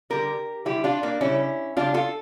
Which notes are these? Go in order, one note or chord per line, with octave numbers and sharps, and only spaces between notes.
D3 G3 G4 A#4
D3 G3 E4 G4
D4 F4
A#3 D4
C#3 G3 C#4 E4
C#3 G3 D4 F4
F4 A4